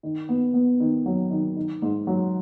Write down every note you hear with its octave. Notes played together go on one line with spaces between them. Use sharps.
D#3
B3
B3
D#3
F#3
D#3
D#3
G#2
F#3